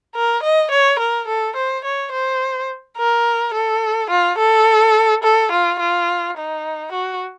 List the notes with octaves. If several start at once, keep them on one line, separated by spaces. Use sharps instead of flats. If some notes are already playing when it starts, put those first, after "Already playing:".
A#4
D#5
C#5
A#4
A4
C5
C#5
C5
A#4
A4
F4
A4
A4
F4
F4
D#4
F#4